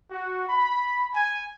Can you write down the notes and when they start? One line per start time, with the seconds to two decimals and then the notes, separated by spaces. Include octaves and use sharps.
0.11 F#4
0.49 B5
1.14 G#5